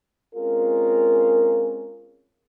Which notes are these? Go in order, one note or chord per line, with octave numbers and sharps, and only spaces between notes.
G#3 C4 C#4 F4 G#4 A#4